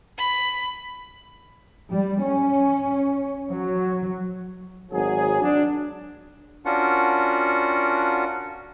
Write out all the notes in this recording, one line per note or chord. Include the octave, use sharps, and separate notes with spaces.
B5
G3
C#4
F#3
G#1 F#3 G#4
D4
C#4 D4 F4 F#4 A#4 F#5